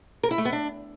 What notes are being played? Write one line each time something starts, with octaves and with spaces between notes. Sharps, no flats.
A#4
E4
A3
B3
D4